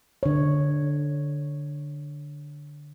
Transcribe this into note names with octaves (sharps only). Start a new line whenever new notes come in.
D3 C#5